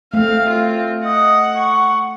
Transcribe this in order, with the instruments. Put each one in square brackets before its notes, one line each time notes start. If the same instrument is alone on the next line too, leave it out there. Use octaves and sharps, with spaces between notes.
[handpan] A3 [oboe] C4 [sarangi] F5
[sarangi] F4
[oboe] D#5 [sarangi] F#5
[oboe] C#6